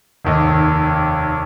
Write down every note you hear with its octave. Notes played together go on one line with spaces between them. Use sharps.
F1 D#2 D#5